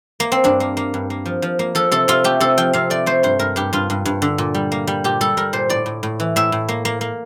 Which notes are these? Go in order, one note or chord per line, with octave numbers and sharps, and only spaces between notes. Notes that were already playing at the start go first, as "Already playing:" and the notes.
A#3
C4
G2 D4
A#3
A#3
G2
A#3
F3
F3
A#3
F3 A4
C3 A4
C3 F4
A3 G4
C3 A4
F3 G5
C3 F5
A3 D5
A3 C5
G2 C5
G2 A#4
G2 G4
G2 F4
G2
G2
D3
A#2
G3
A#3
G3
A#2 G4
G3 A4
G3 A#4
A#2 C5
A2 D5
A2
A2
E3
A2 E5
A2
A#3
A#3
A#3